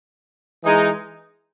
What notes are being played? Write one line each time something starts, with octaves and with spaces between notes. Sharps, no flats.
E3 G#3 D#4